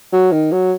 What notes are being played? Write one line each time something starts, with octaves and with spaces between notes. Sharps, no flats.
F#3
D#3
F#3